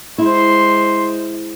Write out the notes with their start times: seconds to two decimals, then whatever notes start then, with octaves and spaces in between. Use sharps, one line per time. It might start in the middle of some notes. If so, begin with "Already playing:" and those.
0.18 G#3 E4 C5 C6